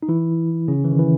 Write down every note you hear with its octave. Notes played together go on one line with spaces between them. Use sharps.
D#4
E3 E4
C#3 C#4
E3
D#3
E3